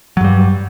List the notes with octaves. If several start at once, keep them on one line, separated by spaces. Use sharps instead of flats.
G2 F#3 G3